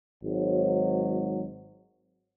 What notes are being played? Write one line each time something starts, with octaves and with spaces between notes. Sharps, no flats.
G#1 G#2 F#3